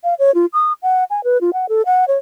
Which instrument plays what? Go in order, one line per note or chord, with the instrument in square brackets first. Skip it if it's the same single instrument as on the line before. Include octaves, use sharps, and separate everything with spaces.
[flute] F5
C#5
F4
D#6
F#5
G#5
B4
F4
F#5
A4
F#5
C#5